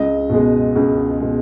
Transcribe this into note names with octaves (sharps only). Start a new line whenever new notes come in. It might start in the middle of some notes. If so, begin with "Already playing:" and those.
Already playing: C#2 D#5
B2 G#3
C#2
B2 G#3